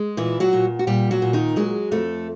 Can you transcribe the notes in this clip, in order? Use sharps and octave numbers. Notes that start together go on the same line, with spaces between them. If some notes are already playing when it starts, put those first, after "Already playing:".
Already playing: G#3
A#2 E3 E4
F#3 F#4
A#2
F#4
A#2 G3 G4
F#3 F#4
A#2
D#3 D#4
F#3 G#3 G#4
F2 A3 A4